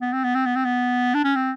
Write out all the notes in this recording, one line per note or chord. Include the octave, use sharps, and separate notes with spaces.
B3
C4
B3
C4
B3
C4
B3
D4
C#4
C4